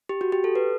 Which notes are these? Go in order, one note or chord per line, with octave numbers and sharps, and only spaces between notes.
G4
F#4
G4
A4
B4